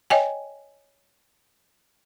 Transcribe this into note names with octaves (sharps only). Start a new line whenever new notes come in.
C#5 D#5 G5 G#5